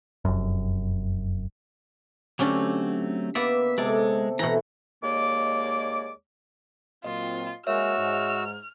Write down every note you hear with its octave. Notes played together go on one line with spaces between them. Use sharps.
F1 F#2
D3 F#3 A3 C4 C#4 G4
A#3 B3 D5 E5
C3 G#3 A4 D5
B2 E3 E4 A4 A#5
D#2 G#3 A#3 C#5 D5 D6
A#2 F#3 C4 F4 D#5
G#3 A#3 F#4 A#4 C#5 E5 E6 F6
G#2